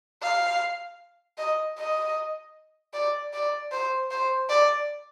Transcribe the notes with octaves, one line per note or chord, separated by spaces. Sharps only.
F5
D#5
D#5
D5
D5
C5
C5
D5